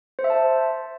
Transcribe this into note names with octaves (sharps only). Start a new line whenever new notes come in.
C5
E5
A5